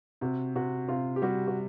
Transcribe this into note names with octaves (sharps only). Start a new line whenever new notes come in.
C3 F#4
C3 F#4
C3 F4
G4
G3 F#4
F#4